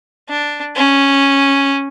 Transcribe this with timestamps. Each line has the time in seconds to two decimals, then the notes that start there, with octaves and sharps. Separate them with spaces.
0.29 D4
0.76 C#4